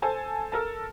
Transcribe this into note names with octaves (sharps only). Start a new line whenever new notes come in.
A4 C5 G#5 A5
A4 A#4 A5